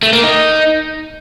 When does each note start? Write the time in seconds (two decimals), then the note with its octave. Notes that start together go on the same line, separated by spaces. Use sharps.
0.03 A3
0.13 A#3
0.23 D#4